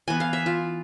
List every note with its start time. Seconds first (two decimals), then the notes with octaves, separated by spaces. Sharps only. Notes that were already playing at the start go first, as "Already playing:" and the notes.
0.08 E3 B3 G#5
0.20 F5
0.33 E5
0.46 F4